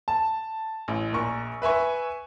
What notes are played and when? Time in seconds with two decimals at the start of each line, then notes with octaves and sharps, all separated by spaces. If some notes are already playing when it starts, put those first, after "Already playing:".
0.08 A5
0.88 A1
1.13 A#1 A#4 C#6
1.62 B4 E5 G#5 C#6